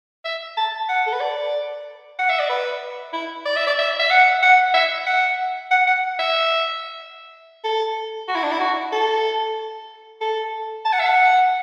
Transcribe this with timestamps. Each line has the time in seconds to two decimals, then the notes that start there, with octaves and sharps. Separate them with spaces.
0.25 E5
0.57 A5
0.89 F#5
1.06 A4
1.13 B4
1.20 D5
2.19 F#5
2.29 E5
2.39 D5
2.49 B4
3.13 E4
3.45 D5
3.56 E5
3.67 D5
3.78 E5
3.99 E5
4.10 F#5
4.43 F#5
4.74 E5
5.06 F#5
5.71 F#5
5.87 F#5
6.19 E5
7.64 A4
8.28 F#4
8.35 E4
8.43 D4
8.51 E4
8.60 F#4
8.92 A4
10.21 A4
10.85 A5
10.92 F#5
10.99 E5
11.06 F#5